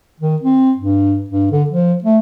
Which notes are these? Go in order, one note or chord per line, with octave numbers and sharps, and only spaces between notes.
D#3
C4
G2
G2
D3
F3
A3